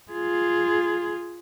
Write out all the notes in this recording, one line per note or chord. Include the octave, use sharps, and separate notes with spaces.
F4 G#4